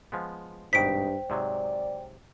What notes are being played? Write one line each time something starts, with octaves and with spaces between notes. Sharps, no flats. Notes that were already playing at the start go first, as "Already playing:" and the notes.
F3 G#3 B3
G#1 G2 B2 D#4 C5 G5 B6 D7
G#2 C3 F#3 D5